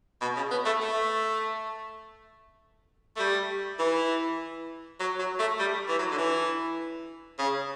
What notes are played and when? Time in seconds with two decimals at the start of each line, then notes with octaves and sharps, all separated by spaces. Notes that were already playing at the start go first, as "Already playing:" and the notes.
0.21 B2
0.36 C#3
0.51 B3
0.66 A3
0.81 A3
3.16 A3
3.19 G3
3.79 E3
5.00 F#3
5.19 F#3
5.39 A3
5.59 G3
5.88 E3
5.98 F#3
6.11 D3
6.18 E3
7.39 C#3